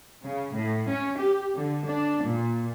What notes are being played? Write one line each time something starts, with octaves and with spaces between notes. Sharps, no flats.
C#3
A2
C#4
G4
D3
D4
A#2